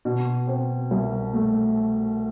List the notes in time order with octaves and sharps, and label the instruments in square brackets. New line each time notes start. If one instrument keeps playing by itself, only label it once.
[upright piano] B2
C4
C2
A3